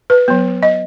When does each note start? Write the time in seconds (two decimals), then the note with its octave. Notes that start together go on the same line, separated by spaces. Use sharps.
0.10 B4
0.28 F#3 B3
0.63 D#5